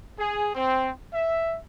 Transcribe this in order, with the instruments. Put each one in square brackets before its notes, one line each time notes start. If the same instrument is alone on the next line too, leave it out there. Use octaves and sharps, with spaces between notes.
[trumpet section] G#4
C4
E5